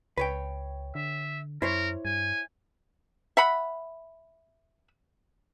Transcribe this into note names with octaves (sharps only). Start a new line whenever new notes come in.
C#2 B4 C#5 G5
D3 E5
F#2 E4 A#4 C5 C#5
G2 G#5
E5 F#5 B5